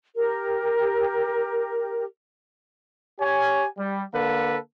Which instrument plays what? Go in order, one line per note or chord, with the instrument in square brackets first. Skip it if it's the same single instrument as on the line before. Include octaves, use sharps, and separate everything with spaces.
[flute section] G4 A#4
[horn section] G4 C#5 G#5
G3
D3 A#3 A4 B4